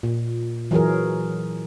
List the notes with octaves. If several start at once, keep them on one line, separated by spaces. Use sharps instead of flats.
A#2
E3 F#3 F#4 G#4 A#4